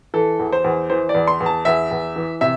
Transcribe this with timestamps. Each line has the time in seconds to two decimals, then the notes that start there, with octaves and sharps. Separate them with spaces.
0.14 E3 A4
0.39 E2
0.52 C5
0.64 E2
0.90 E3 C5
1.09 D5
1.14 E2
1.27 C6
1.40 E2
1.46 A5
1.65 E2 E5
1.91 E2
2.16 E3
2.41 C3 E5